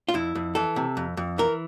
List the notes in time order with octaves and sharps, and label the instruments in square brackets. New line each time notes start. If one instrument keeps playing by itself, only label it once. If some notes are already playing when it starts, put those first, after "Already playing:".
[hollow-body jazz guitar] F4
F2 E4
F2
E3 A4
C3
F2
F2
E3 A#4